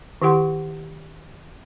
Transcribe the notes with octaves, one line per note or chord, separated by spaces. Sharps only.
D#3 E4 G4 F#5 C6